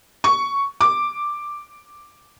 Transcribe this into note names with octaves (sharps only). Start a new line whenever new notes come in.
C#6
D6